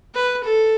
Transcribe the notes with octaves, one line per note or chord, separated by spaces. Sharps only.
B4
A4